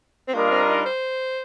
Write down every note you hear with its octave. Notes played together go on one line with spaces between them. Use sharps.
C4
G3 A#3 D4 F4 A#4 D#5
C4
D#4
C5